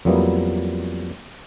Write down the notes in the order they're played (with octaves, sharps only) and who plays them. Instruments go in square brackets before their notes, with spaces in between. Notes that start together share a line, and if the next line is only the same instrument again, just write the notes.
[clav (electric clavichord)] F2 F#3 G3 A#3 B3 E4